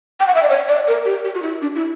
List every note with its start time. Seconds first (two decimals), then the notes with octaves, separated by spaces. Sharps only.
0.20 G5
0.27 F#5
0.35 E5
0.43 D5
0.49 C#5
0.68 D5
0.88 A#4
1.05 G4
1.25 G4
1.34 F#4
1.42 E4
1.61 D4
1.75 E4